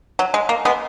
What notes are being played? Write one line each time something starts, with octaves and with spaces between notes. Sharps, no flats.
F#3
G#3
A#3
G#3 B3